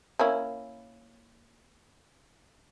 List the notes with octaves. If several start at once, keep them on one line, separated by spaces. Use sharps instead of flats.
A#3 C#4 E4